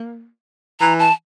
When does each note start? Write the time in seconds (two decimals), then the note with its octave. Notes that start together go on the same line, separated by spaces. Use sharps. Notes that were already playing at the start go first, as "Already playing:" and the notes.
Already playing: A#3
0.80 E3 A#5
0.99 A5